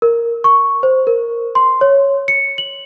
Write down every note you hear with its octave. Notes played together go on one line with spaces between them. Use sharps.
A#4
C#6
C5
A#4
C6
C#5
C#7
F#7